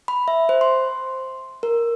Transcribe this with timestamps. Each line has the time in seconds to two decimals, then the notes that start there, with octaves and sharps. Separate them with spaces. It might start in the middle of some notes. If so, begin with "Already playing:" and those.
0.08 B5
0.28 E5
0.49 C5
0.61 C6
1.63 A#4